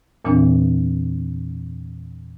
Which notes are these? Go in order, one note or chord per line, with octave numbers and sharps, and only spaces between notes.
E2 A#2 E3 C4 D4